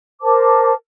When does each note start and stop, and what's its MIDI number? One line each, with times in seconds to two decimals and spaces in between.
0.22 0.73 70
0.22 0.73 72
0.22 0.73 81
0.22 0.73 86